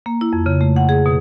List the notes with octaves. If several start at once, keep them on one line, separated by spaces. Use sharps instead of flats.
A#3
E4
F2
C#3
A3
F#5
G#4
B2